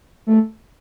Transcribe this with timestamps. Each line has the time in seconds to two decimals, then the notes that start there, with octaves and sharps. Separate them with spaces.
0.27 A3